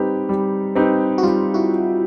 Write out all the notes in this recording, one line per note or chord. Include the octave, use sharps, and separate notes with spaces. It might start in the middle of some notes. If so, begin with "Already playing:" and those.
Already playing: G3 C4 D#4 G4 B4
G3
C4 D#4 G4 B4
F#4
G3 F4
E4 F#4